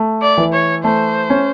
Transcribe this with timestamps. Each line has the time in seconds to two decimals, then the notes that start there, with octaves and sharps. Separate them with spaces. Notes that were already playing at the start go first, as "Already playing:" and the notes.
Already playing: A3
0.22 D5
0.38 E3
0.53 C#5
0.84 A3 C5
1.30 C#4